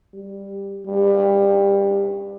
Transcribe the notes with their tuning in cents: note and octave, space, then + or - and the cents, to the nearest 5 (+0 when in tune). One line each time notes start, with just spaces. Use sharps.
G3 +10
G3 +20